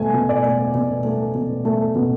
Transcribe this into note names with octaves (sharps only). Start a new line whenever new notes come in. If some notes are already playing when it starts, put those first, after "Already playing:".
Already playing: B2 A3 G#5
B2
D5
A3
B2
A3
B2
A3
B2